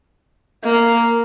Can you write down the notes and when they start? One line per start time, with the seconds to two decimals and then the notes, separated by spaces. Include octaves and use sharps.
0.64 A#3